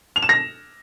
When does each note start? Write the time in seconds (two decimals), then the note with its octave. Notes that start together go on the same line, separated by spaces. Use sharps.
0.16 F7
0.23 E7
0.29 A#6